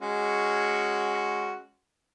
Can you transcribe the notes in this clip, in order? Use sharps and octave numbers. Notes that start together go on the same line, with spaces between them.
G#3 C#4 F#4